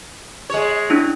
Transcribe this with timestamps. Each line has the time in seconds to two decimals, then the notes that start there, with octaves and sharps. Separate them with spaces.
0.50 G#3 C#5
0.90 C#4 D4 E4